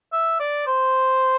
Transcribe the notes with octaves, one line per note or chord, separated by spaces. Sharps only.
E5
D5
C5